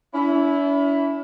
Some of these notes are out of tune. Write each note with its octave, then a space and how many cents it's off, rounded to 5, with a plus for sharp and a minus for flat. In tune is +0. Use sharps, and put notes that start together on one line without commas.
C#4 +45 E4 +0